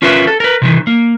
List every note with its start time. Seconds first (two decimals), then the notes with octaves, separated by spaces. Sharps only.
0.02 C#4 F4 A#4 B4 E5
0.27 A4
0.40 A#4 B4
0.62 C3 D#3 E3
0.87 A#3